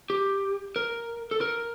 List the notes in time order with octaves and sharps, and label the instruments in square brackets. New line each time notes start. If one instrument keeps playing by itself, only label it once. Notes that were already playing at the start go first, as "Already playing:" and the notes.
[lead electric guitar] G4
A#4
A4
A#4